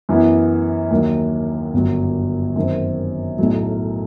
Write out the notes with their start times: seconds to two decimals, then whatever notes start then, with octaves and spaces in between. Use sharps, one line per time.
0.09 F#2 E3 B3 E4
0.91 D#2 D#3 F#3
1.74 G1 F#2 F#3
2.56 F#2 D#3 F#3 C4
3.38 B1 A2 F#3